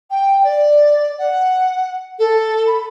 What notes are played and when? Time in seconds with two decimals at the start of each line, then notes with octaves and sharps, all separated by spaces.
0.10 G5
0.43 D5
1.18 F#5
2.19 A4
2.66 B5